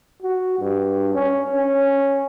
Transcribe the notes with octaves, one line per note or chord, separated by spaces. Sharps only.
F#4
G2
C#4
C#4